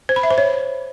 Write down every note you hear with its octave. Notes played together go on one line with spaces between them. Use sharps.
C5
B5
E5
C5
C#5